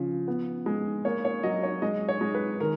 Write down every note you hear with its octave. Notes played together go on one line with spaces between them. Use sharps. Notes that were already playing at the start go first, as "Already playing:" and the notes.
Already playing: C#3 F3
B3
G#3
A#3 C#5
C#5
F#3 D#5
C#5
G#3 D#5
C#5
G#3
B4
D#3 A#4